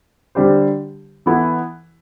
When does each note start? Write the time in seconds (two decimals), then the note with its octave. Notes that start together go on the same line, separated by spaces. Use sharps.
0.35 D3 G3 D4 G4 C5
1.26 E3 B3 E4 A4